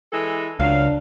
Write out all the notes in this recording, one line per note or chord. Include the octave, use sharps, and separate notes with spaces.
E3 G#3 A4
C#2 F#3 D4 F5